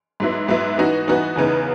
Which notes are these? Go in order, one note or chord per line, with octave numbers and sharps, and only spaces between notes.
G#2 F#3 B3 E4
G#2 F#3 B3 E4
E3 B3 D#4 F#4
E3 B3 D#4 F#4
E2 C#3 E3 B3 D#4